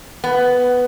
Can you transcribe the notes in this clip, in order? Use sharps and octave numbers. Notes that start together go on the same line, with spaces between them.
B3